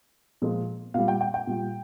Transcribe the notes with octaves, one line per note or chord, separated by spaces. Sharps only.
A#2 F3 G#3
A#2 G3 F5
G5
G5
G5
A#2 G3